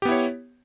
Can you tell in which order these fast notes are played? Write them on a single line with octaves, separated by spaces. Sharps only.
G4 B3 E4 C#5